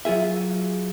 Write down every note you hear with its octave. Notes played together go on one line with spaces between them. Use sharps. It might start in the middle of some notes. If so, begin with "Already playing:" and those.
F#3 F4 G#4 E5